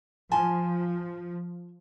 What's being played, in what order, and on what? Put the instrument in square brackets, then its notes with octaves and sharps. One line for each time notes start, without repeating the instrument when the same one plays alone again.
[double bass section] F3 [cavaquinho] G#5 A5 C6